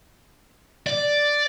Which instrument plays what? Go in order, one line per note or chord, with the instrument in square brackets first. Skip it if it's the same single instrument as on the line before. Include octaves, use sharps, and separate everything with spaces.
[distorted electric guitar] D5